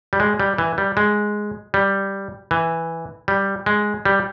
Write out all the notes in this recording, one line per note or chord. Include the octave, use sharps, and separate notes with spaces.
G3
G#3
G3
E3
G3
G#3
G3
E3
G3
G#3
G3